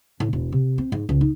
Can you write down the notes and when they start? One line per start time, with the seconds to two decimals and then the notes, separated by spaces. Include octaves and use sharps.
0.20 A2
0.33 E1
0.52 C3
0.78 C4
0.92 G#2
1.09 C#2
1.21 D#4